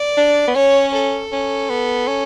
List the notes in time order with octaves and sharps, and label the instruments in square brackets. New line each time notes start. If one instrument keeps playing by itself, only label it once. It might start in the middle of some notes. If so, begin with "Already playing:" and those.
Already playing: [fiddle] D5
[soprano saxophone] D4
B3
[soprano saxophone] C#4 [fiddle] C#5
[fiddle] A4
[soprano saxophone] C#4
B3
C#4